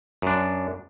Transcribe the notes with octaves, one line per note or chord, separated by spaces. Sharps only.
F#2 D4